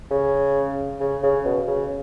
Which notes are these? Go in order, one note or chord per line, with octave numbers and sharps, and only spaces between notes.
C#3
C#3
C#3
B2
C#3